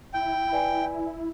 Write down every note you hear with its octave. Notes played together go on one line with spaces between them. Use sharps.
E4 G5
B4 D5 G#5